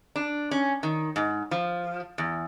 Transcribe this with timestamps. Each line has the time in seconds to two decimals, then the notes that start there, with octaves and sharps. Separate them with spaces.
0.16 D4
0.51 C#4
0.83 D#3
1.16 G#2
1.51 F3
2.18 E2